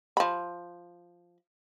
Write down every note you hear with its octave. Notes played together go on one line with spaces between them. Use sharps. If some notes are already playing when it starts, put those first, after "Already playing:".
F3 B5